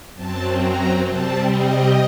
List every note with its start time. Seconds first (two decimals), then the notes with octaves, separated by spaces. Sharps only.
0.14 F#2 F#3 C4 A5
0.59 A#5
1.04 C3 G3 C4 A5
1.49 D#5